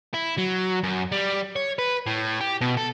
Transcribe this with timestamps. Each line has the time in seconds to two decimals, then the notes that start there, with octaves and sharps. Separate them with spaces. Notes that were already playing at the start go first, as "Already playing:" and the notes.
0.14 E4
0.38 F#3
0.84 F#2
1.12 G3
1.56 C#5
1.78 B4
2.06 A2
2.40 G4
2.61 B2
2.77 A4